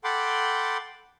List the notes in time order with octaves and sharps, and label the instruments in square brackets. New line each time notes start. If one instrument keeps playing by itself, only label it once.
[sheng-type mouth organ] A4 F#5 G5 B5 C6 D6